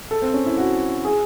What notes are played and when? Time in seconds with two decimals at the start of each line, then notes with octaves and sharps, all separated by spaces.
0.11 A4
0.22 C4
0.34 C#4
0.46 E4
0.58 F#4
1.05 G#4